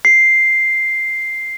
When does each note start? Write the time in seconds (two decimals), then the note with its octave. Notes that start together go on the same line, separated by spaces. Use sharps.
0.05 C7